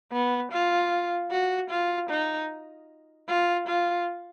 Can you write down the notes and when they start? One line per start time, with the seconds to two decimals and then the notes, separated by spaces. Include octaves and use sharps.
0.13 B3
0.52 F4
1.31 F#4
1.71 F4
2.10 D#4
3.29 F4
3.68 F4